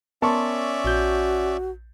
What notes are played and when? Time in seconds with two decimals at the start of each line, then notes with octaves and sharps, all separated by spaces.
0.22 B3 C#4 A#4 D5 E5 A5 C6 C#6
0.85 A#1 F#4 G6